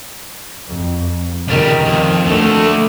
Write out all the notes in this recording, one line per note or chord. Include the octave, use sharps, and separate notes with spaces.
F2
C#2 D#3 G3
F2
D2 D3 A3